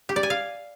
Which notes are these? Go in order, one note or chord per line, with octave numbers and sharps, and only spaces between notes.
G4
D5
G#5
F5